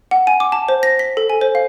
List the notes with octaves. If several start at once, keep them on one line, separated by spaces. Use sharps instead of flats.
F#5
G#5
D6
A5
C5
A#6
B6
A4
G#5
C5
F5